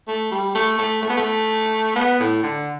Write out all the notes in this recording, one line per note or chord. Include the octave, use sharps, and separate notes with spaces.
A3
G3
A3
A3
A3
B3
A3
B3
A2
D3